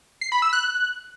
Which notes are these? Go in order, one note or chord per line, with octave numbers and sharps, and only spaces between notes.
C7
B5
E6
F#6